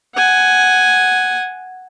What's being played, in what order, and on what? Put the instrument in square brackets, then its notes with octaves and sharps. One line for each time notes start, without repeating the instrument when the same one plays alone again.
[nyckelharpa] F#5 G#5